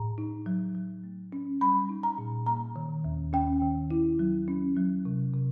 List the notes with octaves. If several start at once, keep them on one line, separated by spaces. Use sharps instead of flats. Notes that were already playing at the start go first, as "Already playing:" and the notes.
Already playing: A2 A#5
D#4
F#3
F#3
A3
C#4
G3 B5
D#4
A#5
A#2
A#3 A#5
D#3
D#2
C#4 G5
D#3
E4
F#3
C#4
F#3
C3
C3